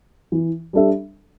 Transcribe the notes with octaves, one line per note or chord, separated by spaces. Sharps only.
E3
G3 D4 A4 E5